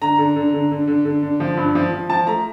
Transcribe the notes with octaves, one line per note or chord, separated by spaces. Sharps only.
D3 A#5
D3
D3
D3
D3
D3
D3
D3
F3
G2
F3
F3
F3 A5
A3 A#5